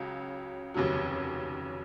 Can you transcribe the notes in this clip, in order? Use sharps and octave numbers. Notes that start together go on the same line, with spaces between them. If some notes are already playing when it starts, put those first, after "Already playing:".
Already playing: C#2 C#3 F#3
F1 D#2 C#3 F#3